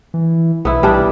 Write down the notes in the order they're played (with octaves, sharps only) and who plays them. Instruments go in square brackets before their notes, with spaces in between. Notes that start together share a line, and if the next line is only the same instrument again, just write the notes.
[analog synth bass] E3
[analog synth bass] B1 [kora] B3 E4
[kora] G3 D4